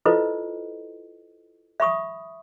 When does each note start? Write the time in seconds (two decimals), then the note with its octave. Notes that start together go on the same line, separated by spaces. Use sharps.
0.05 E4 F4 A4 B4 C5 D#5
1.80 E5 B5 C#6 D#6